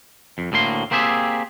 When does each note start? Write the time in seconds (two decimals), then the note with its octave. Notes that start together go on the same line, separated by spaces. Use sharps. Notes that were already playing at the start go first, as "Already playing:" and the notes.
0.38 F2
0.52 D2 A2 A#3 C6
0.91 A#3 C4 G4 G#4 E5